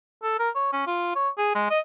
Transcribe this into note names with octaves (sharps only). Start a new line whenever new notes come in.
A4
A#4
C#5
C#4
F4
C#5
G#4
G#3
D#5